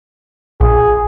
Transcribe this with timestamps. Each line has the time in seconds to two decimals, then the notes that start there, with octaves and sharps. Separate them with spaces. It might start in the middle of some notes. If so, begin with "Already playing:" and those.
0.60 A#1 G#4